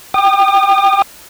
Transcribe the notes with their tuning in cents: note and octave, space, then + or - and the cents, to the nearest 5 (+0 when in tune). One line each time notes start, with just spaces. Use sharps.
G5 +0 D#6 -45